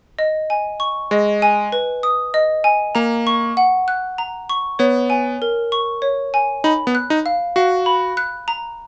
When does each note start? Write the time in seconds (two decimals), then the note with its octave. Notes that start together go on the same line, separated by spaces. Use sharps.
0.19 D#5
0.50 G#5
0.80 C#6
1.11 G#3 D#5
1.42 G#5
1.72 B4
2.03 D#6
2.34 D#5
2.64 G#5
2.95 A#3 A#5
3.27 C#6
3.57 F#5
3.88 F#6
4.18 A#5
4.50 C#6
4.79 B3 C#5
5.10 G#5
5.42 A#4
5.72 C#6
6.02 C#5
6.34 G#5
6.64 D#4 B5
6.87 B3
6.95 F#6
7.10 D#4
7.26 F5
7.56 F#4 F5
7.86 B5
8.17 F#6
8.48 A#5